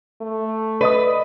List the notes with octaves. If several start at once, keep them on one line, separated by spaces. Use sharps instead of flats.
A3
B4 D5 D#5 D#6